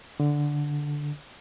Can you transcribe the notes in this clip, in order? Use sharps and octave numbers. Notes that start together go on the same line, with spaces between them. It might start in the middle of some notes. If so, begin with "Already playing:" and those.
D3